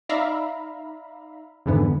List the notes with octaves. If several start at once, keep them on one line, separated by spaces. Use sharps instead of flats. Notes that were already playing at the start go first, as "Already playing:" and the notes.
D#4 D5 E5 F5 A#5 B5
F2 G#2 D3 E3 B3